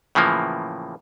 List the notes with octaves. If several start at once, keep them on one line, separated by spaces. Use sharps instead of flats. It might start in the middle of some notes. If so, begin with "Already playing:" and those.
A2 C#3 E3 F3 A#3